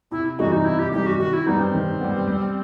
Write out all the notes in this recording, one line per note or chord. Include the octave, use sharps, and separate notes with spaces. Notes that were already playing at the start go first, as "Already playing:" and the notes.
C3 E4
E3 G3 D#4 F#4
D#4
C3 E4
G4
E3 G3 D#4 G4
F#4
D#3 F#4
E4
G3 B3 D#4
C4
D#3
G3 B3
G3